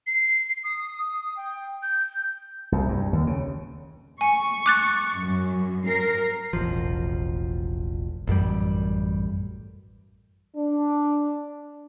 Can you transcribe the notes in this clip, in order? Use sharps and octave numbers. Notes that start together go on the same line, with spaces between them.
C7
D#6
G5
G6
C2
G2
D#2
C#3
G#5 C#6
D6 F#6 A6
F#2
A#4 C7
E1 A1 F3
A1 F#2 G3
D4